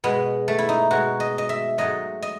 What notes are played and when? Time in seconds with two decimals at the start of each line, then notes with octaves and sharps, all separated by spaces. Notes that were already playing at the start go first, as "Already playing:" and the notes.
0.04 B2 G#3 B3
0.48 A3
0.58 E4
0.69 D#4
0.91 B2 G#3 F#4
1.20 D#5
1.38 D#5
1.49 E5
1.78 G#2 F#3 A3 D#5
2.22 D#5